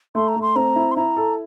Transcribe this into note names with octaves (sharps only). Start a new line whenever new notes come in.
A3 C6
A#5
A3
C6
C4 A#5
E4
C6
E4 A#5
A4